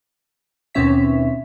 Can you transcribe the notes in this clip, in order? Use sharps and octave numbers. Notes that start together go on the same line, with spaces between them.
D#2 B2 C4 C#4 E5 B6